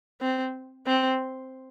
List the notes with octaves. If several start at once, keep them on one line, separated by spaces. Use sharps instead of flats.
C4
C4